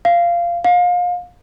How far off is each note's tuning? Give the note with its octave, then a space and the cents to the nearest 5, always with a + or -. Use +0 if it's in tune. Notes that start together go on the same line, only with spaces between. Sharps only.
F5 -15
F5 +30